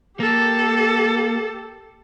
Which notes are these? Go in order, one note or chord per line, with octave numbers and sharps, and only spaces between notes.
A#3 G4 A4